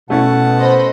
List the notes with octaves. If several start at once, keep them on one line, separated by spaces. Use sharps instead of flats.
B2 A3 C#4 E4 F#5 A5
C5 D#5 B5